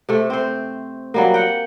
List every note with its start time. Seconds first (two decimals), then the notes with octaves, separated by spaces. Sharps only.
0.09 C3 A3
0.30 C4 C5
1.14 F#3 G3 A#3
1.34 F#5 G5